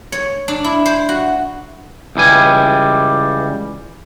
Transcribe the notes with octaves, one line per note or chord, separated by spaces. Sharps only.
C#5
D4
E4
C5
F#4
C#2 E3 G3 G#5